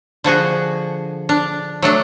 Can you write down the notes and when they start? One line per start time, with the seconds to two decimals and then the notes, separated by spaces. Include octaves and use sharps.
0.24 D3 F3 F#4 G#4
1.29 D4
1.82 F#3 A3 D4